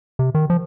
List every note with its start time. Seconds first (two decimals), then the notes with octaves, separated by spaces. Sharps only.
0.19 C3
0.35 D#3
0.50 F3